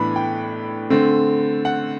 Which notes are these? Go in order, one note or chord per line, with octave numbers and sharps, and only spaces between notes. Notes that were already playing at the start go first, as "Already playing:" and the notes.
Already playing: A2 E3 B3 D4 B5
G5
D3 A3 C4
F#5